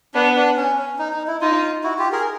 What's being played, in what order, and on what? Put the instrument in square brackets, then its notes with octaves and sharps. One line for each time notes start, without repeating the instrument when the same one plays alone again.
[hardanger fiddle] B3 [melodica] D4
[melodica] D4
C#4
C#4
D#4
D#4
E4
[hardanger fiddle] D#4 [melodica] F4
[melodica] E4 F#4
F4 G4
G#4 A#4